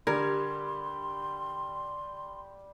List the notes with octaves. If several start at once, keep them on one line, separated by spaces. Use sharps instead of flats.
D3 G3 A#4 C6 G#6